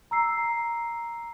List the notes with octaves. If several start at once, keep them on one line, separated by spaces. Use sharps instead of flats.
A#5 E6 C7